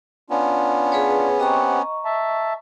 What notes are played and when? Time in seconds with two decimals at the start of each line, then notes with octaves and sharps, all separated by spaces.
0.30 B3 C#4 D4 F4
0.92 G#4 B4 C#5
1.40 C4 G4 D#5 F#5 A#5 C#6
2.05 E5 A5